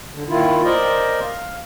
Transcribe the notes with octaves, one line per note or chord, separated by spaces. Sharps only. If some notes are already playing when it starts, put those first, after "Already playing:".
D3
A#2 D#3 E4 F4
A#4 C5 D5 D#5 G5
F5